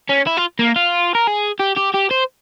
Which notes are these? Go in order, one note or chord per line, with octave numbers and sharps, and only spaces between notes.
C#4
E4
F4
A#3
F4
A#4
G#4
G4
G4
G4
C5